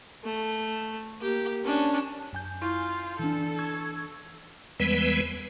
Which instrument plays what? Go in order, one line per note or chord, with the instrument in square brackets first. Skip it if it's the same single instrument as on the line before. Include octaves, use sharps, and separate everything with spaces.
[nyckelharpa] A3
A#3 G4
C#4 D4
[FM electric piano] F#2 G#5 G6
[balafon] E4 [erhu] F4
[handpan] E3 D4 [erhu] A4
[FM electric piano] C#6 E6 G#6
[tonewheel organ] E2 E3 G3 G#3 B3 B4